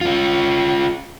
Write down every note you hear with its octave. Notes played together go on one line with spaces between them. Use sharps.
C#4 F4